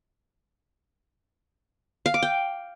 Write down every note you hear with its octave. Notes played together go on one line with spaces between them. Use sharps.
F5
D6
G5